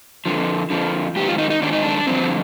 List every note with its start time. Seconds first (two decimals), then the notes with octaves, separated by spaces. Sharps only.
0.26 F2 D3 F3
0.70 F2 D3 F3
1.16 G#2 D#3 G4
1.28 F4
1.38 D#4
1.50 D#4
1.62 G#2 D#3 D4
1.72 D#4
1.83 D4
2.07 G2 D3 F3 C4